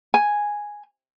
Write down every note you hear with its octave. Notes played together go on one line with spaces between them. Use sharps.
G#5